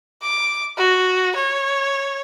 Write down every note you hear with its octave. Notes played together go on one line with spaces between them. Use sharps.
D6
F#4
C#5